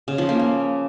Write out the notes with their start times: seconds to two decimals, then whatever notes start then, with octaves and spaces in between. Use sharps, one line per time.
0.08 C#3
0.18 F3
0.29 A#3
0.39 A#3